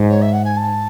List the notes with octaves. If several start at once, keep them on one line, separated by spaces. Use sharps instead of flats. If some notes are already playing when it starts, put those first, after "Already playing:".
Already playing: G#2
C#5
E5
F#5
G#5
A5